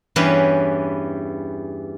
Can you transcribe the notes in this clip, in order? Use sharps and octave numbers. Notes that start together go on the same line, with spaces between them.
E2 G2 E3 C#4 G4 B4